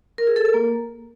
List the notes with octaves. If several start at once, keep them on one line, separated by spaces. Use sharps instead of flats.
A#4
G#4
A4
A#4
A#3